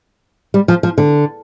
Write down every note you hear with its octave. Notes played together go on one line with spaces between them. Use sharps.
G3
F3
F3
D3